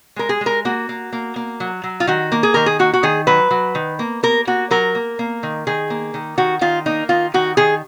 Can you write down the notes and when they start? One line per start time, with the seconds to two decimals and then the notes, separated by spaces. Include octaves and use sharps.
0.16 G#3 A#4
0.29 G#4
0.41 G#3
0.46 A#4
0.65 A#3 F#4
0.89 A#3
1.13 A#3
1.36 A#3
1.60 F#3
1.84 F#3
2.00 F4
2.07 D#3 F#4
2.32 A#3
2.43 G#4
2.54 D#3 A#4
2.66 G#4
2.79 A#3 F#4
2.93 F#4
3.03 D#3 G#4
3.27 F#3 B4
3.51 F#3
3.75 D#3
3.99 A#3
4.23 A#3 A#4
4.47 A#3 F#4
4.71 F#3 A#4
4.95 A#3
5.19 A#3
5.43 D#3
5.67 D#3 G#4
5.90 A#3
6.14 D#3
6.38 D#3 F#4
6.61 D#3 F4
6.86 A#3 D#4
7.09 D#3 F4
7.34 D#3 F#4
7.57 D#3 G#4